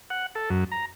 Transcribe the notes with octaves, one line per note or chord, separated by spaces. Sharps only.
F#5
A4
F#2
A#5